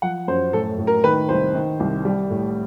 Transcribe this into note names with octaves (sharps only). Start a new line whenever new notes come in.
F3 F#5
F#2 C5
A2 A4
A2
A#4
D#3 B4
C2 C5
D#3
C2
G3
A2